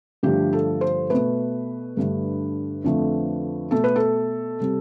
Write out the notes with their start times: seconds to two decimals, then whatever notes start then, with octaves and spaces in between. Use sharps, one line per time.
0.23 G2 D3 F3 A3 G4
0.53 A4
0.81 C5
1.10 B2 A3 B4
1.97 G2 D3 A3
2.84 F2 D3 F3 A3
3.71 B2 A3 A4
3.84 B4
3.96 A4
4.60 C3 G3